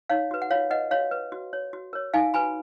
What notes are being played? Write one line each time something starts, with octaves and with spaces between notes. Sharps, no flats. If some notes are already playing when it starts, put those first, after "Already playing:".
D#4 C#5 F5
F#4 B4
F#5
F4 C#5 F5
B4 D#5 F#5
F#4 C#5 F5
B4
F#4
C#5
F#4
A#4 C#5
D#4 F5 G#5
F#4 B4 G#5 B5